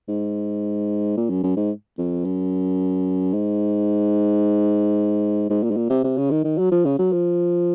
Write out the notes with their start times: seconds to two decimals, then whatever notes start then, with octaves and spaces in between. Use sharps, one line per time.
0.09 G#2
1.17 A#2
1.30 F#2
1.43 F#2
1.57 G#2
1.98 F2
2.25 F#2
3.33 G#2
5.50 G#2
5.63 A#2
5.71 G#2
5.77 A#2
5.90 C3
6.04 C3
6.18 C#3
6.31 D#3
6.45 D#3
6.58 F#3
6.72 F3
6.85 C#3
6.99 F#3
7.13 F3